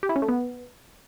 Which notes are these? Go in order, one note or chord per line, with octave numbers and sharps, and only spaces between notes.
G4
E4
C#4
A3
B3